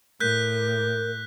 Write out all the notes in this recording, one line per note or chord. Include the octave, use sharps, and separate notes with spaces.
A2 A#4 F#6 G6 B6